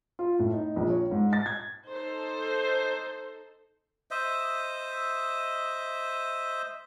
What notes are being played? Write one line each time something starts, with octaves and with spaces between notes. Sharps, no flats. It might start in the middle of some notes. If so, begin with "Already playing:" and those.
F4
A2
D#4
A#1
C#5
G#2
A6
G#6
D#4 A4 C5
C5 D#5 E5